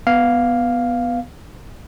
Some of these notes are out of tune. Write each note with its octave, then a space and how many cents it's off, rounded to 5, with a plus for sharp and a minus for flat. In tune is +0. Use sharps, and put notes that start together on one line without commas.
B3 +0 F5 +0